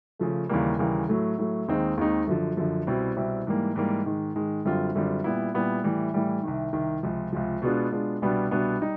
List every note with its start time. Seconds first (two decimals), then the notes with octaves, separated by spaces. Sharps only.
0.19 C#3 F3 A3
0.49 D#2 C#3 E3 G3 A#3
0.79 D#2 C#3 E3 G3 A#3
1.09 A2 F#3 A3
1.38 A2 F#3 A3
1.68 D#2 D#3 G#3 C4 D#4
1.97 D#2 D#3 G#3 C4 D#4
2.27 F#2 D3 F3
2.57 F#2 D3 F3
2.87 C2 B2 G3 C4 E4
3.16 C2 B2 G3 C4 E4
3.47 G#2 E3 G3 A#3
3.76 G#2 E3 G3 A#3
4.06 G#2 D#3 G#3
4.36 G#2 D#3 G#3
4.65 F#2 D3 G3 C4 F4
4.95 F#2 D3 G3 C4 F4
5.24 A#2 G3 B3 E4
5.54 A#2 G3 B3 E4
5.84 A2 E3 G3
6.14 A2 E3 G3
6.43 C2 C3 D#3
6.73 C2 C3 D#3
7.03 C#2 C3 F3
7.33 C#2 C3 F3
7.62 B2 G#3 B3 D4 F4
7.92 B2 G#3 B3 D4 F4
8.22 C2 B2 G3 B3 D4
8.51 C2 B2 G3 B3 D4
8.81 G3 D#4